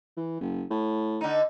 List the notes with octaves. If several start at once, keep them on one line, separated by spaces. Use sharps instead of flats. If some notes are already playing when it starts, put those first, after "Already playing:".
E3
F#1
A2
D3 D#4